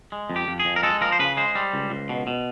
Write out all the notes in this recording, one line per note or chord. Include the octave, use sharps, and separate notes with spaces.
G#3
F2
G4
F2
G#4
F2
A#4
G#3 A4
F3 A#4
C5
C#3 B4
G#3 C5
G3
C#2
C#2
B2
B2